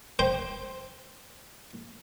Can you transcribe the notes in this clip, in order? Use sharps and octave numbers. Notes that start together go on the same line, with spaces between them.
C5 G5